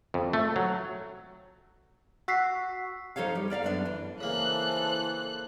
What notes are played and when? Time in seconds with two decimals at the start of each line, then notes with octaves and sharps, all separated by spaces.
0.14 F2
0.33 A3
0.56 F#3
2.28 F#4 E6 B6 C7
3.16 F3 D#4 A4 C#5 F5
3.35 G3
3.50 A#4 D5 E5 F5
3.63 F#2 B3 D4
3.85 E3
4.21 C#3 E3 A#3 A4 C5 F#6